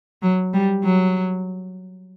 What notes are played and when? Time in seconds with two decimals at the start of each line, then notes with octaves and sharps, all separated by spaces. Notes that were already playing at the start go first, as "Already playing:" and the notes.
0.22 F#3
0.54 G3
0.84 F#3